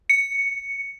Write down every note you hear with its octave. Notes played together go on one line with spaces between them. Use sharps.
C#7